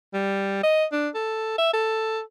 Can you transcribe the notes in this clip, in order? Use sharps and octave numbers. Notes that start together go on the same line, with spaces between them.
G3
D#5
D4
A4
E5
A4